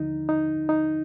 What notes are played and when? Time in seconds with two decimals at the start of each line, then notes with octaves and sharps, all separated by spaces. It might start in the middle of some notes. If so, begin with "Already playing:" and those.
Already playing: D#2 D3 F3 D#4
0.29 D#4
0.69 D#4